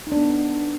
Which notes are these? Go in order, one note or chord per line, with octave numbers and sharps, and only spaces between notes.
B3 D4 D#4